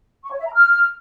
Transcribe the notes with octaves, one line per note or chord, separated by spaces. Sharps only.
C#6
C#5
E5
A#5
F6